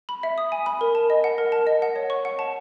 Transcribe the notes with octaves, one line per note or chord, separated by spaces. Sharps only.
B5
E5
D#6
G#5
B5
A#4
A5
D#5
F#5
A#4
A5
D#5
F#5
C#5
C#6
F#5
A5